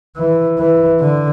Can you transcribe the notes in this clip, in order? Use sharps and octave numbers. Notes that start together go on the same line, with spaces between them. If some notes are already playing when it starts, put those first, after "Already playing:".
E3
E3
D3